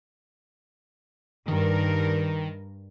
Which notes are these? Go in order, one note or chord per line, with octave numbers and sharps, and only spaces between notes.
G2 D#3 A#4